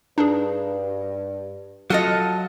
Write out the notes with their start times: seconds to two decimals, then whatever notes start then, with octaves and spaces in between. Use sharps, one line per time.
0.18 G2 D4 D#4 G#4
1.90 F#3 F4 A4 D#5